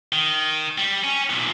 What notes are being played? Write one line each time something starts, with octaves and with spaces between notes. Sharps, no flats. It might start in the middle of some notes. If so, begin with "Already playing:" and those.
D#3
G3
C#4
B1 A#2